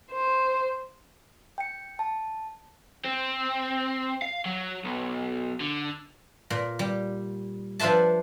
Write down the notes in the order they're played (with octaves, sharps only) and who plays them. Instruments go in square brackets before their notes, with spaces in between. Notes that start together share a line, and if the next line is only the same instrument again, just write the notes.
[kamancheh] C5
[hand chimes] G5 C#7
A5
[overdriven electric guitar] C4
F5
F#3
B1
D3
[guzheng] A#2
G3
F3 D4 F4 B4 E5 A5